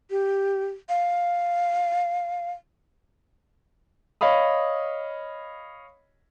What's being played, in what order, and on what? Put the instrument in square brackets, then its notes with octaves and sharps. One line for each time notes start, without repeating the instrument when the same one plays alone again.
[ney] G4
F5
[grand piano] C#5 D#5 F5 B5 D#6